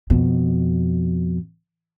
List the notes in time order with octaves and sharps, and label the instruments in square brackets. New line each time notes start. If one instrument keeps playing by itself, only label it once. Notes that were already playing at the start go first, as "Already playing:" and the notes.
[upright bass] F2 B2